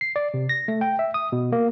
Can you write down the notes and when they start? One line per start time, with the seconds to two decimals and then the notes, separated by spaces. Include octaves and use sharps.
0.01 C7
0.16 D5
0.34 C3
0.49 A#6
0.68 A3
0.81 G5
0.99 E5
1.14 D#6
1.32 B2
1.52 A#3